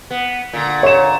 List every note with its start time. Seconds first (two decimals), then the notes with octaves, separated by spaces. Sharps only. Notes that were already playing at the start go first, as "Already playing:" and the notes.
0.11 B3
0.53 A#2 D3
0.83 C#5 E7